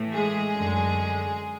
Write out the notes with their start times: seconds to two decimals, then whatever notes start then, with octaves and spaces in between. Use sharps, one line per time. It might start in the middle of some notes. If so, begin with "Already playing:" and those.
Already playing: A2 E3 A3
0.13 G#3 G#4
0.53 F#2 D3 F#3